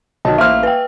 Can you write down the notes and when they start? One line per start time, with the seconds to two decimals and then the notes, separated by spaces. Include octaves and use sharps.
0.25 B1 D#3 F#3 D#4 A5
0.38 A1 A#3 E4 C5 E5 F5 F6
0.63 B4 G5